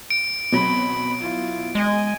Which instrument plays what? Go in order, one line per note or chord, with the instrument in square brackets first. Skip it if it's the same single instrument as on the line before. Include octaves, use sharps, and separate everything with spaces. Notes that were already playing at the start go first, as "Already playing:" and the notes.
[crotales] D7
[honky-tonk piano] B2 F#3 [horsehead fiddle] C4 B5
[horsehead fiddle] E4 F4
[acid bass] G#3 [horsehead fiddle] D#5 G#5